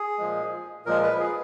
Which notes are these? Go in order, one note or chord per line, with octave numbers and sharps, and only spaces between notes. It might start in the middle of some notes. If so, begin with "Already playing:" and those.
Already playing: G#4
A#2 F3 G#3
A#2 F3 G#3 A#4
B4
G#4